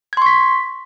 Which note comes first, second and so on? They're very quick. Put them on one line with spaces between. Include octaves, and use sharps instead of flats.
G#6 C6 C#6 B6